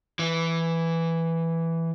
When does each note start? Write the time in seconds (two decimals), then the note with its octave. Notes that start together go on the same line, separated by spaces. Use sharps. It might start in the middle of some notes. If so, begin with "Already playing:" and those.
0.19 E3